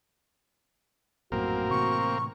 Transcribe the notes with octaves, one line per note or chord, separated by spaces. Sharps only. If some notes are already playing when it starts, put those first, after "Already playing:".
A#1 F#2 A2 A#3 C4 F#4 A#4
A2 C3 E3 C#6